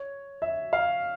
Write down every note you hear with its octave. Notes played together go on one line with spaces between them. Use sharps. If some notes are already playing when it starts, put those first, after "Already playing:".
Already playing: C#5
E5
F5